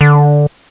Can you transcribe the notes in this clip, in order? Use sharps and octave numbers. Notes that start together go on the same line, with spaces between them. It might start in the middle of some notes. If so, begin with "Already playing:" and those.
D3